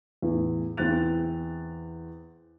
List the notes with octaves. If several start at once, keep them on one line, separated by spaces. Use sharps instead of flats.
E2 A2
E2 C4 B4 F#6 A6 F7